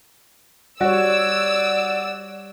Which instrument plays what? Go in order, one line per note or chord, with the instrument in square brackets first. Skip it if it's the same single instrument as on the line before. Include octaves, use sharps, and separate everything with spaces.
[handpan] G3 C#5 [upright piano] F#4 [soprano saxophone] D5 [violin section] E6